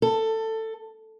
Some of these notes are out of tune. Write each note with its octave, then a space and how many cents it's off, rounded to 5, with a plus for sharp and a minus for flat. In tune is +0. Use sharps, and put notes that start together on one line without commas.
A4 +15